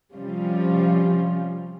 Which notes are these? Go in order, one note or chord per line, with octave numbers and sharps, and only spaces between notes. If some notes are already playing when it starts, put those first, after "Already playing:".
C3 F3 G3 C#4 F4